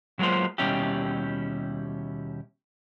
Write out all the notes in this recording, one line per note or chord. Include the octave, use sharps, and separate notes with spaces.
F#3 G#3 A#3 B3 F4 C5
D#2 B2 G3 C#4 E4 G4